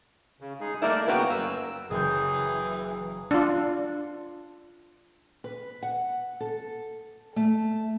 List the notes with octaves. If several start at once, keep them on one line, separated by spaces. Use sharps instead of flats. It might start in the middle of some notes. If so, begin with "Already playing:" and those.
C#3
G#3 D#4 G#4
A3 A#3 D#4 E4 A#4 D5
C#3 A#3 B3 F#4 B4 G5
F#2 A#3 E6
F#1 E3 G#4 G6
D4 F4
B4
F#5
A4
A3